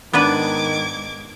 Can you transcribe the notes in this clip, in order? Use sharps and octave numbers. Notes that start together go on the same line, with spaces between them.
G#2 D#3 B3 D4 B4 D6 G#6